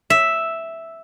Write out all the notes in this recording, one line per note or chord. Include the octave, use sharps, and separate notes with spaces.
E5